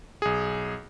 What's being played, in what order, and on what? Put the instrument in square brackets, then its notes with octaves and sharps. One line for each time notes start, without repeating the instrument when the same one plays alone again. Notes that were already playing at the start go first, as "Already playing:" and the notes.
[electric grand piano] B1 G#4